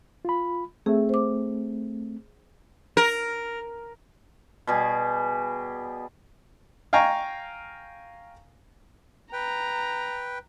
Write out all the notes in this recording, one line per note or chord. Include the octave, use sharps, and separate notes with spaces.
F4 B5
A3 C4 G#4 E5
C5 D6
A#4
B2 G3 G#4
F5 G5 G#5 A#5 C#6
B4 G5 A#5